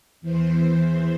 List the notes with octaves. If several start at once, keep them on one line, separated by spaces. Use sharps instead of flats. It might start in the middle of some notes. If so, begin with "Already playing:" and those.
E2 E3 C5